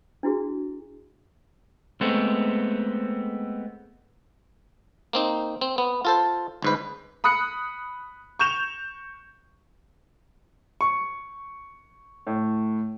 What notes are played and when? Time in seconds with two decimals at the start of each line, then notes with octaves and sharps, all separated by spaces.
0.23 D4 E4 F#4 G#4
2.01 G#3 A3 B3 C4
5.13 A#3 C4 D#4
5.61 C4
5.78 B3
6.05 F4 A4 C5
6.62 G1 G#2 B4
7.24 B5 D#6 F#6 C#7
8.39 C#6 G6 E7 F7
10.81 C#6
12.27 A2